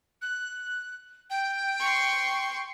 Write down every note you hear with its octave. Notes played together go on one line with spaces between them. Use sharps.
F#6
G5
C6 C#6